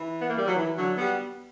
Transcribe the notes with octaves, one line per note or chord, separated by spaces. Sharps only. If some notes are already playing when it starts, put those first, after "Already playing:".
Already playing: E3
B3
A#3
G3
F#3
E3
D3 F#3
G3 B3